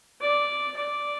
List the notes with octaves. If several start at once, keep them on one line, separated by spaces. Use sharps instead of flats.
D5
D5